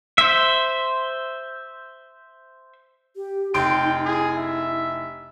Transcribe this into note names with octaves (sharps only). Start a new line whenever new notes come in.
C5 E5
G4
F1 D#4 G5 C6 D7
E4 G#4
E5